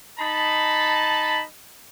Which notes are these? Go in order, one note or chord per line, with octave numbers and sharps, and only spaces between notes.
D#4 A5 B5